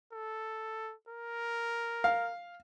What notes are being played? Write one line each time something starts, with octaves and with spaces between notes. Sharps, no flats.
A4
A#4
F5